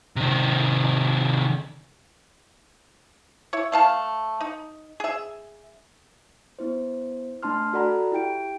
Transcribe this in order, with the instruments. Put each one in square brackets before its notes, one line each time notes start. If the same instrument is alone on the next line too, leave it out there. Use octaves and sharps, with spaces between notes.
[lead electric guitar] C3 D#3
[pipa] E4 C#5
A3 F5 A5
D#4
G#4 E5
[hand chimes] B3 E4 C5
A3 D4 A5 C6 F6
F#4 A4 D5 F#5 A#5 B5
E4 G4 G5 D7